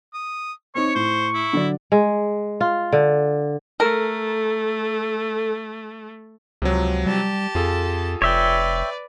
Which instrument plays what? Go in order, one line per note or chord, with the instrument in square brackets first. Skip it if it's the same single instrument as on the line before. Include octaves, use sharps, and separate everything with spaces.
[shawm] D#6
[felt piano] C4 D#4 [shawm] C#5 [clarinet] C#6
[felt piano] A2 [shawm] C5
[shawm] E4
[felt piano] D3 F#3 D5
[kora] G#3
F4
D3
[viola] A3 [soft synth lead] A4 [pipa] A#4
[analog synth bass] C#2 [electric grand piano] C3 F3 F#3
[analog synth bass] G3 [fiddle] G4 A5
[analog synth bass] F2 [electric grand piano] F4 G#4 A4
[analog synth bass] F1 [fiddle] B4 D5 [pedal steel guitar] C#5 E5 G5